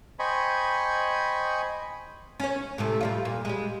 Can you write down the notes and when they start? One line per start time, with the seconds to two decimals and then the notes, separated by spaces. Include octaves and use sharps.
0.19 C5 D#5 G5 G#5 B5 C#6
2.40 C#4 C#5
2.78 A2 C3 A3
3.01 F2 G3 F4
3.25 A#2
3.45 G3 G#3